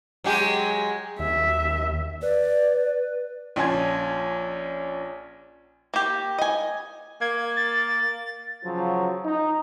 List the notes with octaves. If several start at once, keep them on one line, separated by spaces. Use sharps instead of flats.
F#3 G#3 G4
D#2 E5
B4 D5
A#1 F3 C#4 G#5 C6 G#6
A#3 G4
D#5 G#5
A#3 G#6
A6
C#3 F3 F#3
D#4